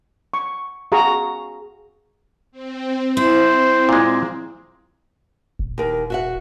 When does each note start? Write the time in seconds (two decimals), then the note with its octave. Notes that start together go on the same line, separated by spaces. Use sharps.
0.34 C#6
0.92 F#4 G#4 F5 A5 A#5 C#6
2.52 C4
3.17 C4 E4 C5
3.89 A#2 G#3
5.59 D#1
5.78 D#2 A#4
6.10 F#4 E5 F#5